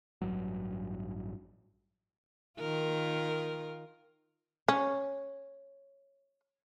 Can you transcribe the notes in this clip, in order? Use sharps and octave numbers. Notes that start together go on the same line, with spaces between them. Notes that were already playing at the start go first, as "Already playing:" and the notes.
A1 G2 F#3
D#3 F4 A#4
C#4 C#5